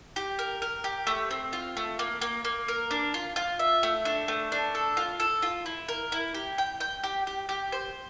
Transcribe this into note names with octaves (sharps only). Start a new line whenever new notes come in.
G4
A#4
A#4
G4
A3
C4
F4
A3
A#3
A#3
A#3
A#4
D4
F4
F4
E5
A3
D4
A3
D4
A4
F4
A4
F4
E4
A#4
E4
G4
G5
G5
G4
G4
G4
C5